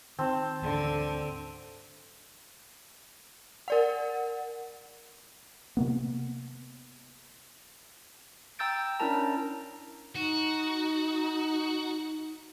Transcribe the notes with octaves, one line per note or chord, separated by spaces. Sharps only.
D#3 C4 A5
D2 G#2 D3 E3
A#4 D5 F#5
C3 A#3 B3
G5 A#5 E6 G6 A6 D7
C#4 D4 E4 A#4 A5 A#5
D#4 F#4